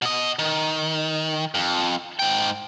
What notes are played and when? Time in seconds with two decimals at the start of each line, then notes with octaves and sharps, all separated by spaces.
0.02 B2 D#5
0.39 D#3
1.54 F2
2.19 G#2 G5